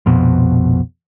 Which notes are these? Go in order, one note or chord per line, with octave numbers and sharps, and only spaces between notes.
A#1 F2 B2